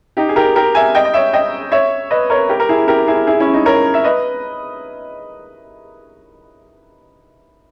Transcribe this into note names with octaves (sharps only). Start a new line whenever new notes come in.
D#4 G4
G#4
G4 A#4
G4 A#4
E5 G#5
D#5 G5
D#5
C#5 E5
D#5 G5
C#5 E5
B4 D#5
A#4 C#5
G4 A#4
A#4
E4 G#4
G4 A#4
E4 G#4
E4 G#4
C#4 E4
D#4
A#4 C#5
E5
B4 D#5